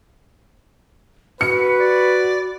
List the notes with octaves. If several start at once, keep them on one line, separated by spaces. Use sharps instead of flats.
F#4 B4 C#7
D5